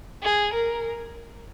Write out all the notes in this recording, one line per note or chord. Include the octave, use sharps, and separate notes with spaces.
G#4
A#4